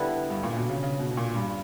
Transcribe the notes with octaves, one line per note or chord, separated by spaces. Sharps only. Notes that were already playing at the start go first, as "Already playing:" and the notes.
Already playing: D3 G3 B3 E4
G2
A#2
B2
C#3
C#3
B2
B2
A#2
G2